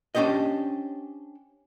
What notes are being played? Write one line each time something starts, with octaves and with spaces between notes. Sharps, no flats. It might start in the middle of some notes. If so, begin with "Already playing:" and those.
C#4 D4 G4 C5 D#5